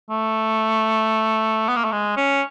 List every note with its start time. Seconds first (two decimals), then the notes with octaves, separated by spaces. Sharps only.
0.10 A3
1.69 B3
1.76 A#3
1.84 A3
1.92 G#3
2.17 C#4